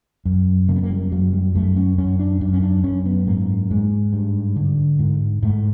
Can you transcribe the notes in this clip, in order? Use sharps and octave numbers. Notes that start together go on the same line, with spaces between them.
F#2
C#3 A#3
B3
A#3
G3
F#2 F#3
G3
F#2 A3
C#4
F#2 C#4
D4
F#2 D4
C#4
D4
F#2 C#4
B3
G#2 A#3
G#2 G#3
G2
D3
G#2
G#2 A3